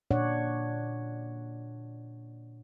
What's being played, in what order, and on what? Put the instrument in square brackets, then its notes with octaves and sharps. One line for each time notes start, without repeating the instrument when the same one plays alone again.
[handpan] A#2 D4 C#5 D5 F#5